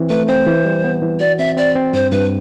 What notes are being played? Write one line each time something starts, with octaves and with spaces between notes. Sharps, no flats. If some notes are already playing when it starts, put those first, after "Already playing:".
Already playing: E3 C4
A3 B4
C4 C5
E3
G3
B3
E3
F#4 D5
C4 E5
C4 D5
C4
G2 C5
G2 B4